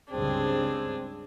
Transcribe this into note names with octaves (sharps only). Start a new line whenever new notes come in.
C#2 G2 C#3 C4 D4 G#4